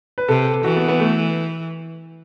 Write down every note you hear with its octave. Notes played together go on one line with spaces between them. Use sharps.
B4
C3 A4
E3 F#4
B3
B3
A3